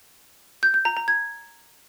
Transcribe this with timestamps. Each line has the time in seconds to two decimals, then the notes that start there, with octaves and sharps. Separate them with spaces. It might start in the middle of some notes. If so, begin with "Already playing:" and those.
0.63 G6
0.74 G6
0.85 A#5
0.97 A#5
1.08 G#6